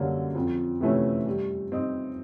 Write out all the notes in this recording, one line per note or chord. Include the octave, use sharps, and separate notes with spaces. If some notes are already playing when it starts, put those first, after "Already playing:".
Already playing: F#2 D3 G3 A#3 C#4
F2
C3 E3 A3 C#4
G3
C4 D#4